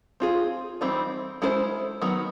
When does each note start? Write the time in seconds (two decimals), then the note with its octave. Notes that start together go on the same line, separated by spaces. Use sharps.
0.20 C4 F4 G#4
0.81 E3 G3 C4 D#4
1.42 G#3 C#4 E4 G#4 C5
2.02 D#3 F#3 B3